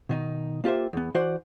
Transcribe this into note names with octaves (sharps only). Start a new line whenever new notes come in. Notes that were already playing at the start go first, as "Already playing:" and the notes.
B2 D#3 D#4
A#3 F4 G4 C5 E5
E2 B3
E3 F#4 C5 D5 F#5